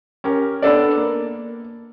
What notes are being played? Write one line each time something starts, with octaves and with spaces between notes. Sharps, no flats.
C#4 G4 A#4
B3 D4 A4 D5
A#3